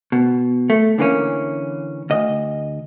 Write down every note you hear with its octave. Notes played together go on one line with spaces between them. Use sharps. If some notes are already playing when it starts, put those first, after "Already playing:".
B2
A3
D3 E3 A#3 C#4
D2 D#5